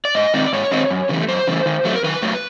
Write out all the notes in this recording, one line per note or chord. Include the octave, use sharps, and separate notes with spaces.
D5
G#2 D#5
D#3 G#3 C4 D#4 D5
G#2 C#5
D#3 G#3 C4 D#4
F#2
C#3 E3 A3
F#2 C5
C#3 E3 A3
D#3
F#3 A3
A#4
D#3 B4
F#3 A3